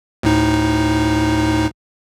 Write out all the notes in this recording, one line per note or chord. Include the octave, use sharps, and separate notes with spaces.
D2 A2 D#4